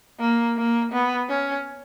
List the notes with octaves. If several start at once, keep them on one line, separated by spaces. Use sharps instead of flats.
A#3
A#3
B3
C#4